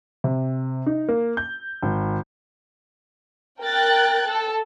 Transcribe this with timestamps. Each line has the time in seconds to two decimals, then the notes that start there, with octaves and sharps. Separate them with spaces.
0.24 C3
0.86 D#4
1.09 A#3
1.37 G6
1.83 G#1
3.62 A#4 G5 F#6 A6
4.29 A4